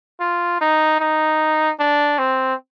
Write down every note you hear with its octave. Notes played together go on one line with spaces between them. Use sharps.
F4
D#4
D#4
D4
C4